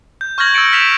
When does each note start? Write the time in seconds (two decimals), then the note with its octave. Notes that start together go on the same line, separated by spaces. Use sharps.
0.21 G6
0.38 C#6 F6 G6 G#6 A#6 F#7
0.54 E6 G6 A6 C#7 D7 F#7
0.72 F6 B6 D7 E7 F7